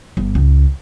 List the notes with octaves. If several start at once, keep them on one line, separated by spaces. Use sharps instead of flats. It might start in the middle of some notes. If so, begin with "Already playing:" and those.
G1
C#2